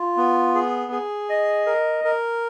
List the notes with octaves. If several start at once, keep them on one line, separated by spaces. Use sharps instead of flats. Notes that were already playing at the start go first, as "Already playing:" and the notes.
Already playing: F4
B3
G#4
G#4
D#5
A#4
A#4